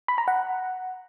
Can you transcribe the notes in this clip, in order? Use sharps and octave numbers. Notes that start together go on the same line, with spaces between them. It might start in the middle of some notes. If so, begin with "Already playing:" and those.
B5
A#5
F#5